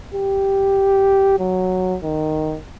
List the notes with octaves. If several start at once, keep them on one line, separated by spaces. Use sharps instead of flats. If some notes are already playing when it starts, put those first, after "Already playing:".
G4
F#3
D#3